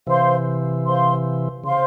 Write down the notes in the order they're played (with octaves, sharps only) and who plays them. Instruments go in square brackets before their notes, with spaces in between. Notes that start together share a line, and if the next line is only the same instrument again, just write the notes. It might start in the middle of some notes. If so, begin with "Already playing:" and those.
[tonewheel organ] C3 E3 [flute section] C5 F5 C6
[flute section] C5 F5 C6
[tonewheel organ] C#3 [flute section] C5 F5 C6